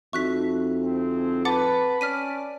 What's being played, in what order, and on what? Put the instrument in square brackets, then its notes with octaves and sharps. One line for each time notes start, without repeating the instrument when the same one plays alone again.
[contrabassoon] F2 [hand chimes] D#4 F#4 E5 [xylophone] C#6 F#6 B6
[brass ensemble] D2 C4 G#4
[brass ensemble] B4 [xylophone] F#5 D6 A6 [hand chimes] A5
[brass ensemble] C#4 D5 [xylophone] F6 B6 D#7